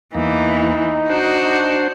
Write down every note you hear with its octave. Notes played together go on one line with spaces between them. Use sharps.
E2 E3 A#3 D#4
D4 F#4 C5